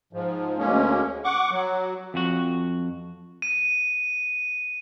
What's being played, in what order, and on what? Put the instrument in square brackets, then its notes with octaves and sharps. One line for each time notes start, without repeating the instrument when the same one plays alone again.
[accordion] G#2 F3
D2 G#3 A#3 C#4
F#5 C#6 D6
F#3
[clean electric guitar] F2 F#4
[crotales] D#7